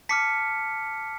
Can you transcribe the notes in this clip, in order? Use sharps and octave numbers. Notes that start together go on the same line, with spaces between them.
A5 D6 F6 B6 C#7